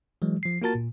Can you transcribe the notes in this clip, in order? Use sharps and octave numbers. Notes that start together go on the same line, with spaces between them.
E3 F#3 G#3
F3 C7
A#3 F4 F#4 A#4 A5 A6
A#2